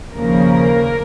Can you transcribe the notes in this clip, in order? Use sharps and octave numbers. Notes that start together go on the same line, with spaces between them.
D#2 C#3 F3 A#3 A#4